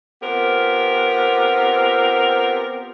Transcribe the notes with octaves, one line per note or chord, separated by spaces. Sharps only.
B3 C4 F4 G4 A#4